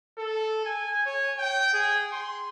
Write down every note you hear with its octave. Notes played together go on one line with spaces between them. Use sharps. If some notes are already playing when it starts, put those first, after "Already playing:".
A4
G#5
C#5
G5
G#4
C6